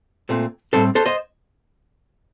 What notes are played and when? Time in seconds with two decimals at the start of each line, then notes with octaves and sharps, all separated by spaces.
0.29 A#2 A3 C4
0.73 A2 G3 C4 A4 C5
0.95 A4 C5
1.06 C5 D#5